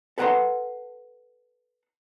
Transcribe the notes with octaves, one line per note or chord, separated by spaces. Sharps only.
A4 B4 F#5 G5 A#5 C6